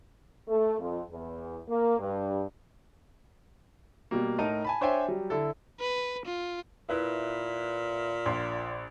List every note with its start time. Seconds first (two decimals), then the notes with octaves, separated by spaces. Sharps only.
0.48 A3
0.79 F2
1.10 E2
1.68 A#3
1.98 G2
4.11 B2 G3 A#3
4.39 A2 D#4 A#4 A5 A#5 D#7
4.65 G#5 A5 B5
4.81 D4 C5 C#5 E5 G5 G#5
5.08 F#3 G3
5.30 D3 E4 A4
5.80 B4
6.26 F4
6.89 A#2 E4 B4 E5
8.26 A#1 C6